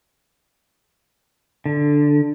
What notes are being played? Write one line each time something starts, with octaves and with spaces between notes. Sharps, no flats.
D3